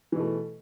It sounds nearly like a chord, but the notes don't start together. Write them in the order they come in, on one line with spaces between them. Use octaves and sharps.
E3 B2 A3